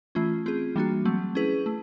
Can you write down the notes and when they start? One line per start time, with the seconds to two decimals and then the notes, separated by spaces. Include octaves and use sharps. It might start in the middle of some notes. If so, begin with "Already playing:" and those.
0.15 E3 A3 C#4 F4
0.46 C4 F4 G#4
0.76 E3 G3 A#3 D4 F#4
1.05 F#3 A3 C4
1.35 C#4 E4 G#4 B4
1.66 A3